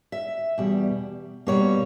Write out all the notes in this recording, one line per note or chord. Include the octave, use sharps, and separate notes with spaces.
E5
E2 B2 G3
B2 G3 A#3 C#5